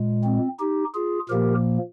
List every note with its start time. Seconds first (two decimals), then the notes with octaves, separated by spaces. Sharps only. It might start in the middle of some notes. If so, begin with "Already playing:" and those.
Already playing: A#2 G#3
0.24 C4
0.60 D#4 G4
0.95 F4 G#4
1.29 A#2 F3 A#3 G4 A#4